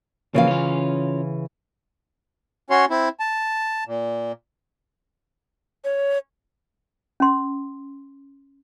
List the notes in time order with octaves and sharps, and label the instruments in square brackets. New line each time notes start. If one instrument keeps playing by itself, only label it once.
[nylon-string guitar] C#3 E3 F5 [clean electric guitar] F3 A#3
[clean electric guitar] C#4 F4
[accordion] C#4 F#4 C#5 C6
C4 E4
A5
A#2
[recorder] C#5
[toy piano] C#4 C6